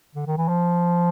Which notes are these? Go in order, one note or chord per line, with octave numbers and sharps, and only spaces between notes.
D3
D#3
E3
F3